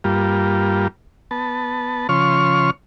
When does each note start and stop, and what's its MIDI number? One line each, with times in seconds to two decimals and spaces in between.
0.04 0.88 43
0.04 0.88 55
0.04 0.88 58
0.04 0.88 65
1.31 2.07 59
1.31 2.07 81
2.09 2.70 49
2.09 2.70 53
2.09 2.70 73
2.09 2.70 84
2.09 2.70 85
2.09 2.70 89